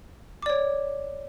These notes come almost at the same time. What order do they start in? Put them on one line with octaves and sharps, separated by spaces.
D6 D5 C#5